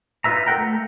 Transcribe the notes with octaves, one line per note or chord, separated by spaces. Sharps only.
D#4 F4 B4 E5 A#5
A4 A#4 F#5 G5 A#5
A3